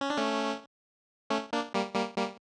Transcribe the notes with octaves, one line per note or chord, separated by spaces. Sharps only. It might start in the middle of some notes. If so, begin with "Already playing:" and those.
C#4
D4
A3 C#4
A3 C#4
A#3 D4
G3 A#3
G3 A#3
G3 A#3